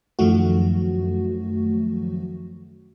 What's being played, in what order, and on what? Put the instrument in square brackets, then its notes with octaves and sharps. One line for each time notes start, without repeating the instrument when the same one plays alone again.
[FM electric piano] F#2 D#3 F3 F#3 A3 F#4